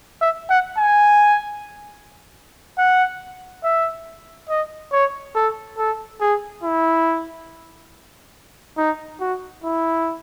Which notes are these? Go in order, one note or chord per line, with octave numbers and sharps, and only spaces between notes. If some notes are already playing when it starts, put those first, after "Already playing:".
E5
F#5
G#5
F#5
E5
D#5
C#5
A4
A4
G#4
E4
D#4
F#4
E4